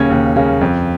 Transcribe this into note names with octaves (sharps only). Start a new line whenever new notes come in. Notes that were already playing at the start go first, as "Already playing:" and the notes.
Already playing: D#2 C#3 A#3 C#4 G#6
D#2
C#3 A#3 C#4
F2